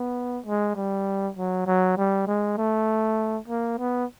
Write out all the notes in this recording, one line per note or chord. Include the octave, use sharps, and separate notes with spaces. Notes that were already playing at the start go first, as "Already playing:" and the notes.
Already playing: B3
G#3
G3
F#3
F#3
G3
G#3
A3
A#3
B3